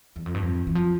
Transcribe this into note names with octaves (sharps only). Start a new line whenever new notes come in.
E2
F2
G2
F2
E3
F3